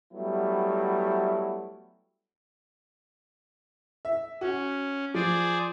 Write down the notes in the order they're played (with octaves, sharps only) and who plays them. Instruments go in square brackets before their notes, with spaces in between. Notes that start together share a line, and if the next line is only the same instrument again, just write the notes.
[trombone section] F#3 G3 A3 B3 E4
[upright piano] E5
[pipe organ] C#4 [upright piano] F#4
[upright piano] F3 [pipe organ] G#4 C5 D5